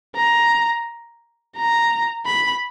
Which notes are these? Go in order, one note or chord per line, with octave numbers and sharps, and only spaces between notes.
A#5
A#5
B5